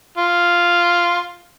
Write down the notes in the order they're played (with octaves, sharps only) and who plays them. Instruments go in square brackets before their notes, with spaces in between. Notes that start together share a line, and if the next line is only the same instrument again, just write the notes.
[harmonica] F4